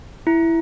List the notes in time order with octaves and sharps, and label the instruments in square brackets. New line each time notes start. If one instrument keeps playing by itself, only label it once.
[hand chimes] E4